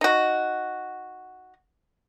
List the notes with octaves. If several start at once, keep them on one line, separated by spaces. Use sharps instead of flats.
D#4 F#4